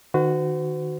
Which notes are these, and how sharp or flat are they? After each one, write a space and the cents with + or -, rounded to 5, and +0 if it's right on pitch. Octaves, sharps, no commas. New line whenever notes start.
D#3 -25 F#4 +0 C5 -45